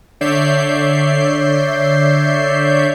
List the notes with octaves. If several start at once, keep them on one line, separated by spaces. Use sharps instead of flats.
D3 C#5 D5 E5 G6 C7